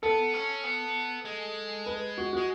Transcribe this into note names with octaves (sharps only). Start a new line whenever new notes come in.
B3 A4
C#4
B3
G#3
B4
F#4
G#3 F#4